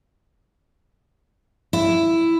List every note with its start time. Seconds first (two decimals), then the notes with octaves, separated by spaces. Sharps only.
1.73 E4